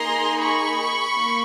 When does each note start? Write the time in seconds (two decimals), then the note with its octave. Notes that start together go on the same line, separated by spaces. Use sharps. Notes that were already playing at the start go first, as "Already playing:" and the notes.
Already playing: A#3 D#4 G#4 A#5 C6
0.43 B5 C#6
1.15 A#3